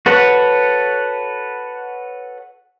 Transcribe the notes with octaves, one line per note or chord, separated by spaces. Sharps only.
F#4 A4 B4 C#5 F#5